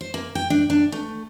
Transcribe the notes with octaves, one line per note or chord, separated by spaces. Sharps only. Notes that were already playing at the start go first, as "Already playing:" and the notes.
C5
A#3
G5
D4
D4
A3